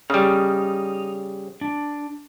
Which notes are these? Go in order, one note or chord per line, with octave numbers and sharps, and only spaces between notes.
C#3 G3 D#4 F6
D4